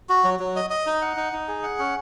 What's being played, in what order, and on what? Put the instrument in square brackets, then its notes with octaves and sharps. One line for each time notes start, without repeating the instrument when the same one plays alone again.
[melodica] F#4
F#3
F#3
D#5
D#5
D#4
F#5
D#4
D#4
G#4
F#5
C#4